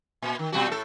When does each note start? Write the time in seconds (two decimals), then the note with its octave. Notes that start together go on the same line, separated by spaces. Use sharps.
0.22 A#2
0.39 D#3
0.52 B2 G3 F#4
0.68 A2 A4